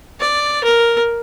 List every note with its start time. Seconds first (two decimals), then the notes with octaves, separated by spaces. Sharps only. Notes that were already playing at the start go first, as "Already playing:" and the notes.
0.20 D5
0.64 A#4